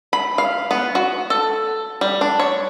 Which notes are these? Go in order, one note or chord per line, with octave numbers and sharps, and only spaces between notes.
B5
F5
B3
F#4
A4
G3
D4
C#5